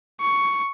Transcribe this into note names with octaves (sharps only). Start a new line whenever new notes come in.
C#6